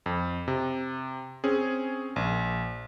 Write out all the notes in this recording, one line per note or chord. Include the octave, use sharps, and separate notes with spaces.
F2
C3
C4 C#4 G#4
A#1